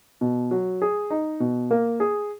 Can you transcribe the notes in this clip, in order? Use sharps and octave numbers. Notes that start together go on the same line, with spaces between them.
B2
F#3
G#4
D#4
B2
A#3
G#4